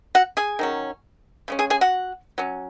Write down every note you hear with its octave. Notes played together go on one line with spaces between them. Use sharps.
F#4 F#5
G#4 G#5
D#3 F#3 C#4
C#3 G#3 C#4
G#4 G#5
G#4 G#5
F#4 F#5
F#3 C#4